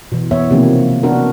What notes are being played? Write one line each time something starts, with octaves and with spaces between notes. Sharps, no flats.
B2 E3
E3 B3 C#5 E5
C3 D#3 F3 A#3 C4
B3 D4 F#4 A#4